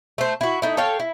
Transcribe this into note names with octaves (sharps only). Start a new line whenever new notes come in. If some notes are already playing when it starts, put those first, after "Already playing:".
A3 C5
E4 F#4
A3 D#4 E4
A4 C#5 F5 G5
E4